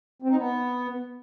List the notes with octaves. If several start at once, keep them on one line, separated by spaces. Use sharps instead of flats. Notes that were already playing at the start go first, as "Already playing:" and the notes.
C4
D#4
B3